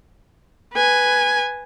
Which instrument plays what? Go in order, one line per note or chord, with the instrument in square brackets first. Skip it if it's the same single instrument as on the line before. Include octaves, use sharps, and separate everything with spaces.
[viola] B4 G#5